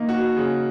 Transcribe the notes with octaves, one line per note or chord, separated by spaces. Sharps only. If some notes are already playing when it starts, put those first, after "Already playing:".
Already playing: A#3 D#4
F#4
C#3